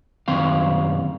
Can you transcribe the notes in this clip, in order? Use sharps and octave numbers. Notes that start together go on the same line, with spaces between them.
F#2 D#3 C4 F5